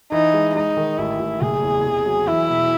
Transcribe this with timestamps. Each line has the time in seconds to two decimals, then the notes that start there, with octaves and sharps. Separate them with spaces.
0.12 E3 D#4
0.33 G#3
0.55 G#3 D#4
0.77 D#3
0.98 A1 E4
1.20 A1
1.41 F#1 G#4
1.62 E2
1.84 C3
2.06 F#3
2.27 E3 E4
2.49 E1